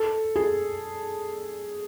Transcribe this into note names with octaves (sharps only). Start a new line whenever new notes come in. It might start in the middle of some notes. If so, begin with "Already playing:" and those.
Already playing: A4
G#4